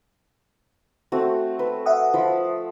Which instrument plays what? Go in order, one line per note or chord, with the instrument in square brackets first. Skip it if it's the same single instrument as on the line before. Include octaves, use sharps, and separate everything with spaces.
[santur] A3 C4 F#4
B4
[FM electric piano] E5 F#5 D#6
[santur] F3 B5